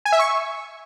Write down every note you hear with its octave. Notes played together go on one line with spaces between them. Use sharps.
G#5
E5
C#6